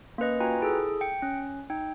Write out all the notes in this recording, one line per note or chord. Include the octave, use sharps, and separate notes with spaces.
A#3 C#4 B4 D#5
F4 F#4 B4 G5 G#5 A#5
E4 G#4 A4
G5 C#7
C#4
D#4 G5